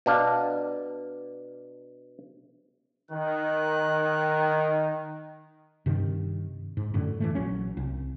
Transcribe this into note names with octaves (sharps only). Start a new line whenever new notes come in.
B2 D4 F5
D#3 F#6
G2 C3 D#3
G#2
F#2 A2 D3
E3 G#3 A3
A#1 F#3 C#4
C2